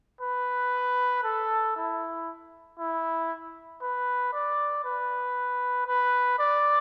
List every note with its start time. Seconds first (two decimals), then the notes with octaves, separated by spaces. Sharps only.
0.21 B4
1.24 A4
1.76 E4
2.79 E4
3.81 B4
4.33 D5
4.85 B4
5.87 B4
6.39 D5